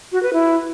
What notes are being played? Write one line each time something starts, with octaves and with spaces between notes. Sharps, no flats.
F#4
B4
E4